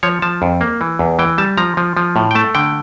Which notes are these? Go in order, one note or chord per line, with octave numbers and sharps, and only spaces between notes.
F3 C#5
F3 A5
F2
A#3
E3
E2
E3 G5
G3 A5
F3 A#5
F3
F3
A2
G5
A3 A5
D3 G5